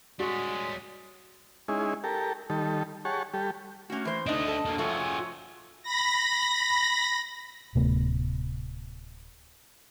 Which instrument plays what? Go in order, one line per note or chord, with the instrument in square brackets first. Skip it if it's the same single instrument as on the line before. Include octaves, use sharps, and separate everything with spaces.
[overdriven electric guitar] G3 C#4 [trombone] G#3 [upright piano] F#4 F#5
[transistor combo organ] G#3 C#4 D#4 E4 G#4
G4 A4 A#4
D#3 G3 A4
G4 G#4 C#5 F#5 A5 C#6
G3 G4 A4
[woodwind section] A3 A#3 [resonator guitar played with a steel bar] C#4 F#4
[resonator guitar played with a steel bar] E3 C5
[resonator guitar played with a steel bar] C3 D#4 [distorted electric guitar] A3 D4 [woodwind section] D#5
[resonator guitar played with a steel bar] A4
[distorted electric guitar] D3 A#3
[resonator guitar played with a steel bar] F3 A3 [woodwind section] F4 A4 C#5 [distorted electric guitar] F#4 G#4
[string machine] B5 A#6
[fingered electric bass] D1 C3 A3 B3